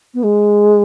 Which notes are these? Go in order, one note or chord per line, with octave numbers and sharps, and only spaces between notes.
B3
G#3